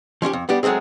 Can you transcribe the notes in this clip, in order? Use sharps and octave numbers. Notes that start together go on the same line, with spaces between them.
F3 C#4 E4 G4
F2
G3 B3 D4 G4
F#3 G#3 A3 C4 G#4